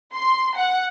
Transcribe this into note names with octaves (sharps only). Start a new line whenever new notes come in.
C6
F#5